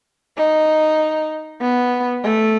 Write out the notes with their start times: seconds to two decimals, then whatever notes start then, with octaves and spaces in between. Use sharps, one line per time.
0.37 D#4
1.62 B3
2.25 A3